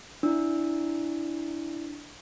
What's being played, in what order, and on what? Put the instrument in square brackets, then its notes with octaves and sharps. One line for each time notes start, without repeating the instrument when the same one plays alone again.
[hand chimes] D4 E4